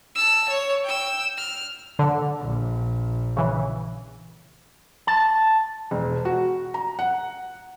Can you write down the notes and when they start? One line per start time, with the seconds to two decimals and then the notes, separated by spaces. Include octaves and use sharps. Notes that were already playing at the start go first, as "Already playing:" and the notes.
0.15 A5 E6
0.49 C#5
0.84 G5 E6
1.37 F6
1.99 D3
2.39 A#1
3.37 C#3 E3
5.07 A5
5.91 E1
6.25 F#4
6.74 A#5
6.99 F#5